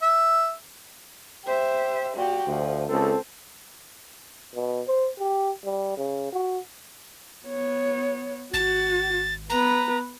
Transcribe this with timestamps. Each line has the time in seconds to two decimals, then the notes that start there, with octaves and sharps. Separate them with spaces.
0.02 E5
1.44 G4 C5 E5
2.16 A#2 F#4 G4
2.47 D2 F3
2.88 C#2 C4 A4
4.55 B2
4.87 C5
5.19 G4
5.64 G3
5.97 C#3
6.32 F#4
7.46 B3 C#5
8.54 G#1 F#4 A6
9.50 B3 B4 A#5